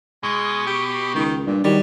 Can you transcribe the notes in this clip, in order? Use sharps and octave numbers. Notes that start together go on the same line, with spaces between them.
B2 G#3
G4
C#2 D#3
G2 A#2
D#3 F#3 G3